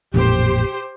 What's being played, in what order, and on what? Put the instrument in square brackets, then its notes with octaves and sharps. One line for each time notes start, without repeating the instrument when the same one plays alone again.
[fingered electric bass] A1 F2 A#2 [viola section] G4 C5